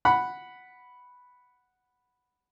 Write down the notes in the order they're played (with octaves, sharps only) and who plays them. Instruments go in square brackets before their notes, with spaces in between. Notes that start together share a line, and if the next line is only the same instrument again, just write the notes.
[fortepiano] F#5 B5